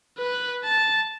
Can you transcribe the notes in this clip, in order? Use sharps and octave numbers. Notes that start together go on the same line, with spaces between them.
B4
A5